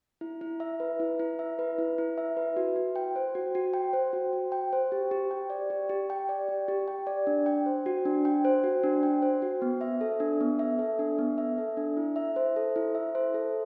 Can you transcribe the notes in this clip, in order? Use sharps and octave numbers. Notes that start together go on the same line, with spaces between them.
E4
E4
E5
B4
E4
E4
E5
B4
E4
E4
E5
B4
F#4
F#4
G5
C5
F#4
F#4
G5
C5
F#4
F#4
G5
C5
G4
G4
G5
D5
G4
G4
G5
D5
G4
G4
G5
D5
D4
G5
C5
F#4
D4
G5
C5
F#4
D4
G5
C5
F#4
B3
E5
A4
D4
B3
E5
A4
D4
B3
E5
A4
D4
E4
E5
C5
A4
E4
E5
C5
A4